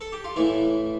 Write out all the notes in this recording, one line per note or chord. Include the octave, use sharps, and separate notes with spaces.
A4
G4
F4
A2 E3 E4